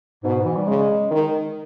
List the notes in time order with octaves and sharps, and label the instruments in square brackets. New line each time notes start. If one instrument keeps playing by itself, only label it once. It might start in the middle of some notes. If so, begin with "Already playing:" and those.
[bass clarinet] G#2 [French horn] B2
[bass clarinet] G#2
E3
G3
[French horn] C#3 [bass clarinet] G#3
[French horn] D#3